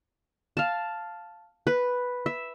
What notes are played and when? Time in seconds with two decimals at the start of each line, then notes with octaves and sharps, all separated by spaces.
0.57 F5 A5
1.67 B4
2.26 E5